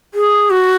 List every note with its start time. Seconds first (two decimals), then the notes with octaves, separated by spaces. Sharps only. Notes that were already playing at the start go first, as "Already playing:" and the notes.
0.14 G#4
0.50 F#4